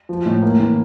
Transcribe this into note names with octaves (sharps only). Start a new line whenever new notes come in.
F3
A2
A#3
E3